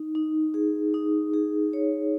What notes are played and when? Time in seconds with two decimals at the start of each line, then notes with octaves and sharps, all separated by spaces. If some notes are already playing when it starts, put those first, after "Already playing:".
Already playing: D#4
0.15 D#4
0.54 G#4
0.94 D#4
1.34 G#4
1.73 C#5